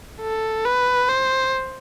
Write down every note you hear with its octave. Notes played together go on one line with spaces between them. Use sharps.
A4
B4
C5